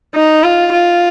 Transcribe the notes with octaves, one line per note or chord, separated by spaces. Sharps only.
D#4
F4
F4